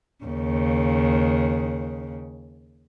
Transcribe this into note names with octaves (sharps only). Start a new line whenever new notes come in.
D#2 C#3